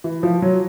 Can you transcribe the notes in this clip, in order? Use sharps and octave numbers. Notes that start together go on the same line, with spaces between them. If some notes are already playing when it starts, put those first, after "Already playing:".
E3
F3
F#3